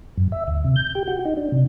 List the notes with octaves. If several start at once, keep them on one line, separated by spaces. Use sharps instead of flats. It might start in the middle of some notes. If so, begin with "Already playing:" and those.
F#2
E5
D2
C3
G6
G4
F#4
D#4
D4
C3